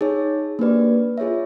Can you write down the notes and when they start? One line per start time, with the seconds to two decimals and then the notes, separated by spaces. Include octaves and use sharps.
0.01 D#4 G#4 C#5
0.59 A#3 D4 G4 B4 D5
1.18 F4 G#4 C#5 E5